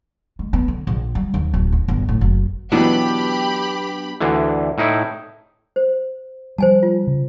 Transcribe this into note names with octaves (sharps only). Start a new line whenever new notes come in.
G#3
B3
D3
A#1
G3
D#2
D1
D#2
G1
A2
F#1
B2 E3 F#3 B3 D4 G4 B5
D2 D3 E3
A2 D#4 E4
C5
F3 G3 C5 G#5 A5
F4
C#3